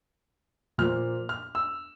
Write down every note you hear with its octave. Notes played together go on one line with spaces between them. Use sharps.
A#2 F3 A#3 F6
F6
E6